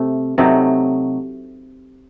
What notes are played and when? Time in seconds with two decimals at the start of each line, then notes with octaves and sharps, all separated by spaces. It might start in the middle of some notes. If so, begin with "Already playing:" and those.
Already playing: C3 A3
0.38 C3 F#3 A3 D#4